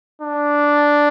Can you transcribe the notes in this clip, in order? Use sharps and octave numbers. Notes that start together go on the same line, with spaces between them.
D4